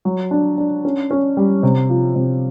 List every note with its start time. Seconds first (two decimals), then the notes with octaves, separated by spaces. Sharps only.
0.05 F#3
0.31 D4
0.58 D4
0.85 C#4
1.11 C#4
1.37 G3
1.63 C3
1.90 F3
2.16 C3